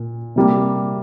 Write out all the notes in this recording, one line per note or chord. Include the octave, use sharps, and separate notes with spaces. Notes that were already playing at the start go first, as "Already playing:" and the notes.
Already playing: A#2
C3 G3 A#3